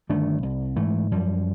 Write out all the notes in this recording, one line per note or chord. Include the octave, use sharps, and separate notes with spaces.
G1 D#3 A3 D4
C2
G#2 E3 A3
F#2 F3 G3